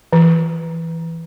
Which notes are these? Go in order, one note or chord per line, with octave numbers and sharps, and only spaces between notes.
E3